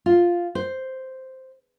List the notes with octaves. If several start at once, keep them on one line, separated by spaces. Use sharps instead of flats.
F4
C5